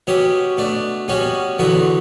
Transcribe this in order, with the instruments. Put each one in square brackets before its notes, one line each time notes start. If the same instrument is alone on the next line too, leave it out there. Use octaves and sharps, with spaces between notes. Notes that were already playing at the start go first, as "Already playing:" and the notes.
[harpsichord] B2 F#3 C#4 G4
B2 A3 D4
B2 G3 C#4 F#4
E2 D3 F#3 B3 F#4